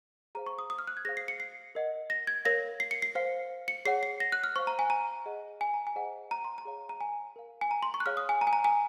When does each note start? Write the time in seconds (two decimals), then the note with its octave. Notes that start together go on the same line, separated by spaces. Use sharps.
0.35 G#4 C5 F5 A#5
0.46 C#6
0.59 D#6
0.70 D#6
0.79 F6
0.87 F#6
0.97 G#6
1.05 G#4 C5 F5 A#6
1.17 C7
1.28 C#7
1.40 C7
1.75 A#4 D#5 F#5
2.10 A#6
2.27 G#6
2.45 A#4 C#5 F5 A#6
2.80 C7
2.91 C#7
3.02 C7
3.15 C5 F5
3.68 C#7
3.85 G#4 C#5 F#5 C7
4.03 C7
4.20 A#6
4.32 F#6
4.44 F6
4.56 C5 F5 C#6
4.67 A#5
4.79 G#5
4.90 A#5
5.26 G#4 D#5 F#5
5.61 G#5
5.74 A#5
5.87 G#5
5.96 G#4 C5 D#5 F#5
6.31 A#5
6.44 C6
6.58 A#5
6.65 G#4 C#5 F5
6.89 A#5
7.01 G#5
7.36 A#4 F5
7.61 G#5
7.71 A#5
7.83 C6
7.94 C#6
8.00 F#6
8.06 G#4 C#5 F5 F6
8.17 D#6
8.29 G#5
8.41 A#5
8.47 G#5
8.53 A#5
8.64 G#5